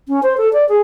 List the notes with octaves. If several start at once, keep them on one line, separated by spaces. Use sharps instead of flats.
C#4
C5
A4
D5
G#4